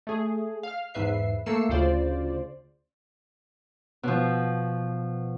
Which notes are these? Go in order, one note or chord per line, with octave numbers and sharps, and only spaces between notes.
A3 G#4
F5 F6
E2 G#2 B4 E5 C7
A3 A#3 E6 C7 C#7 E7
D2 C#3 F4 C5 D5
B2 F3